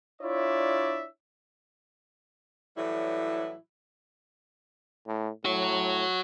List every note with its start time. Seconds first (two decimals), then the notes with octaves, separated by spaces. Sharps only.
0.22 D4 E4 F4 C#5 D5 E5
2.76 A2 E3 F#3 G3 E4
5.07 A2
5.45 A2 F#4 C#5